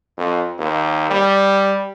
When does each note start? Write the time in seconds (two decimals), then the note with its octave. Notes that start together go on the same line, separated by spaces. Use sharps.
0.17 F2
0.58 D#2
1.10 G3